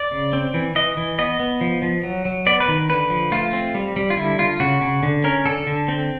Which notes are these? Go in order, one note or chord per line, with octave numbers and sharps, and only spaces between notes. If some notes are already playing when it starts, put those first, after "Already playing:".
Already playing: D5
C#3
C4
E3
E3 D#5
E3
B3 D#5
B3
F3
F3
F#3
F#3
B3 D5
B4
D#3
D3 B4
F3
A3 F4
C4
G3
G3
F4
D3 E4
D3 F4
C#3 F#4
C#3
D3
C#4 A#4
D3 A4
D3
C4